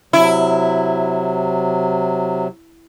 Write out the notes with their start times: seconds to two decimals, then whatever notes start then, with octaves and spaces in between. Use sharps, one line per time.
0.13 C3 F#3 E4